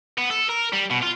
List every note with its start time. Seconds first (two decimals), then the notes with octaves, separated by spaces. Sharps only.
0.18 B3
0.30 A4
0.49 A#4
0.72 G3
0.90 B2
1.02 F4